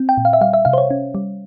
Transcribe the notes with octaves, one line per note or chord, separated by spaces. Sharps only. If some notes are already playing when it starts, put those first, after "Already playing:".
Already playing: C4
G5
A#2
F5
E5
G3 F5
E5
C3 F5
C5
C#5
C#4
G3